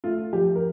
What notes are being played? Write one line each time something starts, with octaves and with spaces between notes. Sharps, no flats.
A3 F4
F3 G4
A#4